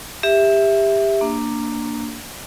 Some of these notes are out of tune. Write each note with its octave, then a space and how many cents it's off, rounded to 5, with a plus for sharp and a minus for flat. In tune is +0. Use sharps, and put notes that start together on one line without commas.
G4 +25 E5 +0
A#3 -10 D4 +0